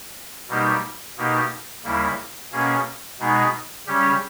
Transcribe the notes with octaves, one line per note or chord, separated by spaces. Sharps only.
B2 G3 A#3 D#4 G4
B2 A#3 D#4 G4
D#2 C#3 G3 A#3 E4
B2 A#3 C#4 G#4
B2 G#3 B3 D#4 G#4
C#3 G3 C#4 G4